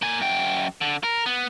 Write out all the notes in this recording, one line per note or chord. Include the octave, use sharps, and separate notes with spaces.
A#3 G#5
F#2 G5
D3
A#4
B3